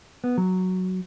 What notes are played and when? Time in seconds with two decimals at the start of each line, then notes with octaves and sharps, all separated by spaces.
0.24 B3
0.38 F#3